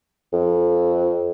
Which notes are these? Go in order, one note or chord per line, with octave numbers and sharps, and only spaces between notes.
F2